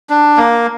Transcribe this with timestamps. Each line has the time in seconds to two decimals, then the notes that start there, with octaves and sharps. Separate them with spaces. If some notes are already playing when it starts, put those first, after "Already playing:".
0.10 D4
0.37 A#3